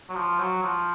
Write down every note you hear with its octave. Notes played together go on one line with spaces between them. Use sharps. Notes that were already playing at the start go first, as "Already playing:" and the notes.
F#3
F3
F#3
F3